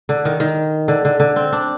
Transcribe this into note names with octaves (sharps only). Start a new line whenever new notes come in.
D3
D#3
D#3
D3
D3
D3
C4
D4